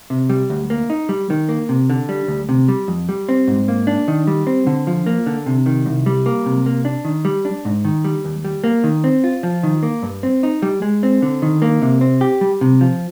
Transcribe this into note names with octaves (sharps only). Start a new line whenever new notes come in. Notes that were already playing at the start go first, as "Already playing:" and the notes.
C3
G3
D2
A#3
D#4
G3
D#3
A#3
C3
D3
G3
D2
C3
G3
F2
G3
C4
G#2
A#3
D4
D#3
G3
C4
D3
F3
A#3
D3
C3
D#3
C2
G3
A#3
C3
A#3
D4
D#3
G3
D4
G#2
D#3
G3
D#2
G3
A#3
D#3
C4
F4
F3
D#3
A#3
G2
C4
D#4
G3
G#3
C4
D3
D#3
A#3
C3
C4
G4
G3
C3
F3